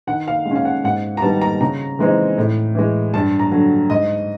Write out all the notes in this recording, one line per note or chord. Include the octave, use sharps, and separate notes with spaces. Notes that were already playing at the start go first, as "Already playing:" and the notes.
D#3 F#5
F5
G#3
C#4 F5
F#5
G#2 F#5
A#5
D#3 G3 B3 A5
A#5
C#3 A#5
E3 G#3 C4 D#4
A2
E3 G#3
G2 A5
A#5
D3 F#3
G#2 D#5